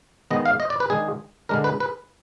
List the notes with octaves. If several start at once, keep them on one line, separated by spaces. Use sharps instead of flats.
D#3 G#3 B3 D#5
F5
D#5
D5
B4
D#3 G#3 D4 G#4
D3 G#3 D4 A#4
B4
B4